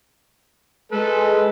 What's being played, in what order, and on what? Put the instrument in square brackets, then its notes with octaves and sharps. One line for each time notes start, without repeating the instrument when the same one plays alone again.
[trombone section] G#3 [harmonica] A4 B4